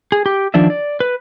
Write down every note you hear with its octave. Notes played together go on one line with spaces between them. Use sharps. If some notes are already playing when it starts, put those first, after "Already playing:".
G#4
G4
D#3 F3 D4 D5 E5
D5
B4